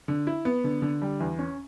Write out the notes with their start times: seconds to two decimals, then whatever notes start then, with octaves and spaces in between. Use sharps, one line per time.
0.08 D3
0.27 E4
0.45 B3
0.64 D3
0.82 D3
1.02 G3
1.20 E2
1.39 C#4